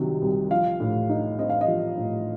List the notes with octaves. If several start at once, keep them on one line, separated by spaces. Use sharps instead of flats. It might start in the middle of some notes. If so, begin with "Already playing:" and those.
Already playing: C2 C3 D#3 F#3
C2
F3 F5
A2
D#4
C4 D#5
F5
D#5
F3
A2